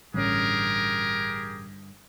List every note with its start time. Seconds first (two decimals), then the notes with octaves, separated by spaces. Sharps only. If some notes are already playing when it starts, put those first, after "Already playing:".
0.14 A1 G2 D3 C#4 G4 G#4 A#4